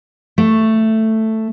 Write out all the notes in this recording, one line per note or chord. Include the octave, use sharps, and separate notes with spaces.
A3